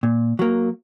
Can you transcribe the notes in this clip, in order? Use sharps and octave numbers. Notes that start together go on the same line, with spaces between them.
A#2
F#3 A#3